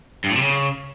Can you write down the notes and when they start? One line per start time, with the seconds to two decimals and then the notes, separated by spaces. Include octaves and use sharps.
0.24 G2
0.30 A2
0.36 C3
0.42 C#3